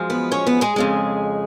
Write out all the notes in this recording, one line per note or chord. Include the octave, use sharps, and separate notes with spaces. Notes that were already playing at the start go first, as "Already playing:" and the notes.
Already playing: F#2 F3 G#3
B3 B4
C#4 C#5
B3 B4
G#3 G#4
F2 C#3 G#3